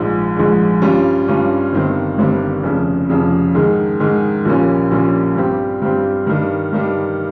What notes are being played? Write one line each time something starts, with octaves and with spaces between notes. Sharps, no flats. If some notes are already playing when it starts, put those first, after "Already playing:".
Already playing: A#1 G#2 F3 G#3
A#1 G#2 F3 G#3
G2 G3 C#4 F4
G2 G3 C#4 F4
G1 G2 D#3 G3 C4
G1 G2 D#3 G3 C4
F1 F2 C#3
F1 F2 C#3
G#2 D#3 G#3
G#2 D#3 G#3
A#1 A#2 G3 A#3 C#4
A#1 A#2 G3 A#3 C#4
G2 G3 C4 G4
G2 G3 C4 G4
G2 D#3 G3
G2 D#3 G3